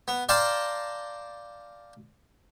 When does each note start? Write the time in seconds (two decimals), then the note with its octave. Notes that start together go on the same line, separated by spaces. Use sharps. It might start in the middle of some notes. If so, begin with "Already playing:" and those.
0.08 B3
0.29 D5 F5 G5 A5 A#5 C6